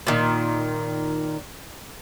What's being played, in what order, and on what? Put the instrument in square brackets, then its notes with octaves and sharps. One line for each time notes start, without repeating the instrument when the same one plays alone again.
[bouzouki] A#2 D#3